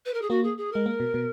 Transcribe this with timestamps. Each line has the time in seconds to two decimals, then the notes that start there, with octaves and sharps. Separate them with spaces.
0.06 B4
0.14 A#4
0.22 G#4
0.30 A#3 F#4
0.44 G#4
0.58 G#4
0.72 G#3 A#4
0.86 A#3
1.00 B2
1.14 B2